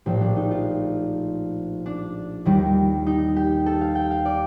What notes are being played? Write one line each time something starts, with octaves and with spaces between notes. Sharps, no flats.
A#1 A2 F3 G4
D4
D#4
F4
D4
D#2 D#3 G3
D#4
G4
A4
F5
G5
F5
D5